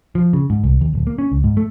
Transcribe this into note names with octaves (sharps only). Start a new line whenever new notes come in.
F3
C#3
G#2
C2
D#2
D1
A#3
C#4
C#2
G#2
A3